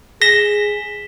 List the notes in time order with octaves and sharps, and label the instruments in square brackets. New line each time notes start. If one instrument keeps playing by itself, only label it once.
[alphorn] G#4 [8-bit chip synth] A#6 [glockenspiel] B6 E7 G7